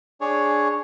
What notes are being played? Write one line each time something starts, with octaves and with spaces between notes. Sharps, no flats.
D4 G#4 C#5